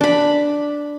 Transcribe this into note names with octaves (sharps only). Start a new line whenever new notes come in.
D4 B5